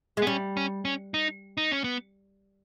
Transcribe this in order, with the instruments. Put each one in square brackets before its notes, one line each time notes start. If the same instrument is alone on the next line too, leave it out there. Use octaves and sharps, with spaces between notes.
[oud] G#3
[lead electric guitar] B3
[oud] G3 [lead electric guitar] C#4
[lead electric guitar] C#4
C#4
D#4
D#4
C#4
B3